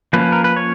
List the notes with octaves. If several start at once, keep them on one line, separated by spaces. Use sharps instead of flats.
F3 A#3 C#4 B4
A#4
B4
C#5